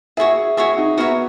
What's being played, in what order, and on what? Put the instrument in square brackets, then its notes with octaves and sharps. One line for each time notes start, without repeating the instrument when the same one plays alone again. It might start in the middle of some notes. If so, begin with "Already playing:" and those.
[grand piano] E4 G#4 [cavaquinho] F#4 C#5 E5
[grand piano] E4 G#4 [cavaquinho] F#4 C#5 E5
[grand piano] D#4 F#4
[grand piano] B3 [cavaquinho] F#4 A#4 C#5 E5